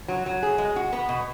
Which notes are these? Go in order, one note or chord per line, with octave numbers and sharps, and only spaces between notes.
F#3
F#3
G#4
G#3
F#4
B3
B2